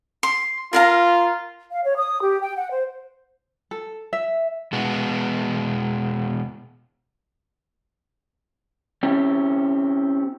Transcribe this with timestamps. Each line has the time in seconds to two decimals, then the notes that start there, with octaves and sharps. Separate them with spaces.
0.23 C6
0.73 F4 A#4 F5 A#5
1.71 F5
1.84 C#5
1.97 D#6
2.21 G4
2.41 G5
2.56 F#5
2.70 C5
3.71 A4
4.13 E5
4.73 B2 G#3 B3
9.03 C4 C#4 E4 G4